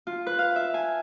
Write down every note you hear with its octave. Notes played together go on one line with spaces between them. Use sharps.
F4
B4
F5
E5
G#5